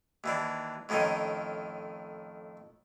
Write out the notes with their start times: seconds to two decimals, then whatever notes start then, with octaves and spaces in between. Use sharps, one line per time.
0.24 D#2 E3 D4
0.89 F2 A2 D#3 C#4 D#4